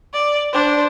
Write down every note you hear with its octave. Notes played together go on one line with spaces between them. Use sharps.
D5
D4 C5